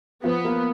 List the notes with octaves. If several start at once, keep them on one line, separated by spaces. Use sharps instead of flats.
F3 B3
A#3